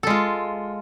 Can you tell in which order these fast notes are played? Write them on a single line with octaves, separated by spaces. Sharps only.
A4 G#3 F4